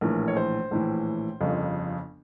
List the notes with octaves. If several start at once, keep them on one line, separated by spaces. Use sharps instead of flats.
A#1 A2 E3 A#4
C#5
C5
A#1 A2 E3
G1 F2 C#3 F3